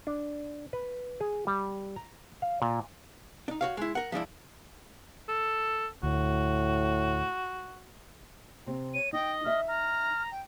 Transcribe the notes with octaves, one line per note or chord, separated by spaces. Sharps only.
D4
B4
G#4
G3
A#5
F5
A#2
D4 D#4
F#4 C#5 F5
G#3 E4
A#4 F#5
F3 G#3 D4 E4
A4
D2 A2 F#4
C3 C4
C#5 D#7
D#4 D#5 G5
D#4 E5 F6
A#5 F6
G5